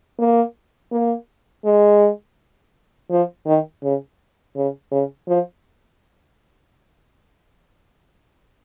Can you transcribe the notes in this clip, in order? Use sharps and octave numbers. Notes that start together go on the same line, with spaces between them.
A#3
A#3
G#3
F3
D#3
C#3
C#3
C#3
F3